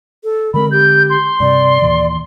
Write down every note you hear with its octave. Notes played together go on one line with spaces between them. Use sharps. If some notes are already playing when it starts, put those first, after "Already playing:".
A4
D3 G#3 C4 A#4 B5
G4 G6
C6
G2 C3 D5
D#2 A#2 E3